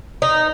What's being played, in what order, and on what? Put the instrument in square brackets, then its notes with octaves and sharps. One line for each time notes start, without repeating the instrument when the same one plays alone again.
[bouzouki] D#4